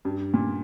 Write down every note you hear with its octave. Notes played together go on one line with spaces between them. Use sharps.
G2
A#2